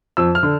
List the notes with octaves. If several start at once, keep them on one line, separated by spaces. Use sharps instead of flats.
F2 E6
F6
D3